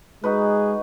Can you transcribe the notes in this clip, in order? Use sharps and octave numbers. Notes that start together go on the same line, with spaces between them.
G#3 D#4 F#4 G#4 B4